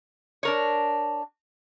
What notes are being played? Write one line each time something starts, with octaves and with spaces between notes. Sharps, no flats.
D4 A#4 C#5